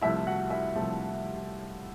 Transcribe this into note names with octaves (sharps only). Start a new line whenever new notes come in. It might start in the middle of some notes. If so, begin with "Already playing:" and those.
C2 C3 F3 A3 E4 E5
F#4 F#5
E4 E5
C2 C3 F3 A3